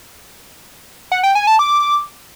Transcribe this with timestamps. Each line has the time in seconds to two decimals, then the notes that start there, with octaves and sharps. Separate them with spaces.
1.12 F#5
1.23 G5
1.35 G#5
1.47 A5
1.59 D6